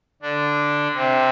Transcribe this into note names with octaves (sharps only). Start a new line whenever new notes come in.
D3 D4
C3 C4